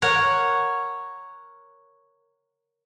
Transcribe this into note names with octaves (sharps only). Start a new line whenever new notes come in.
A#4 C#5 F#5